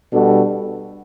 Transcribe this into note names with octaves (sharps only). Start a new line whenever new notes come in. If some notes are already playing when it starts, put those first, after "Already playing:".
B2 G3 D4 F#4 A4